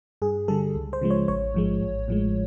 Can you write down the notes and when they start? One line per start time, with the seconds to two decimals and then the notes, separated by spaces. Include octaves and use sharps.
0.22 G2 G#4
0.48 D3 G3 A4
0.75 C#2
0.93 C5
1.01 C#3 F3 G#3
1.10 C#5
1.28 A1 C#5
1.54 G#2 F3 G#3
1.82 A1
2.08 A2 F3 G#3